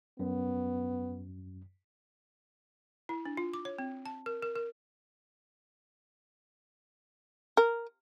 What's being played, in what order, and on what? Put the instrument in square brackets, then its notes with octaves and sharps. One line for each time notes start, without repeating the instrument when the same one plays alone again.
[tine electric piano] F#2 [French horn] B3
[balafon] E4
D4
F4
D6
C#5
C4
A5
A#4
A#4
A#4
[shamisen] A#4